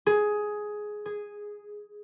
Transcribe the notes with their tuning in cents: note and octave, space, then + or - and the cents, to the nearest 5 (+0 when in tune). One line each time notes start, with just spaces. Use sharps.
G#4 +10
G#4 -5